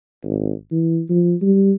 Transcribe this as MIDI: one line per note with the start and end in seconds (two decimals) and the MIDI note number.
0.23 0.52 32
0.72 1.02 52
1.10 1.35 53
1.42 1.73 55